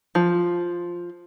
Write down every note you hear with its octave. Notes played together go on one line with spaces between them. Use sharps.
F3